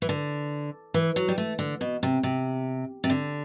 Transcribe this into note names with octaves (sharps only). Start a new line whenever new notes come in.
E3
D3
E3
F#3
G3
A3
D3
B2
C3
C3
C3
D3